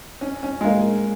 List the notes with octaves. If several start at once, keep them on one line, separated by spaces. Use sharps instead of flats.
C#4
C#4
G#3
A#3